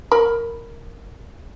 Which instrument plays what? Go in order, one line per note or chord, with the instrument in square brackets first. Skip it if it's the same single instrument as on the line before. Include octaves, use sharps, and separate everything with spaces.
[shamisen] A#4 B5